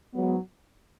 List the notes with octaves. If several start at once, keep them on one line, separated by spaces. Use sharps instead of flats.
G#2 F#3 B3